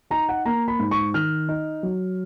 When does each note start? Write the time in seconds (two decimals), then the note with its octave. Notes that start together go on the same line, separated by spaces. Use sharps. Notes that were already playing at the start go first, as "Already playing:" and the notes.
0.10 D#4 A#5
0.29 F#5
0.46 A#3 A#5
0.68 B5
0.79 G#2
0.91 C#6
1.14 D#3 F6
1.49 D#4
1.83 F#3